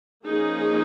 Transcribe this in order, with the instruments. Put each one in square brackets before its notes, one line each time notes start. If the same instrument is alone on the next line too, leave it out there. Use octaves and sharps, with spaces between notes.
[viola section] F3 A#3 C#4 D#4 G#4